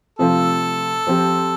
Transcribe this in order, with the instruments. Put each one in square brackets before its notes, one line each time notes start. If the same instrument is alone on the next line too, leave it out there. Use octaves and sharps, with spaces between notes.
[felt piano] C3 F3 A3 C4 F4 [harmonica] A4
[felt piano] F3 C4 G4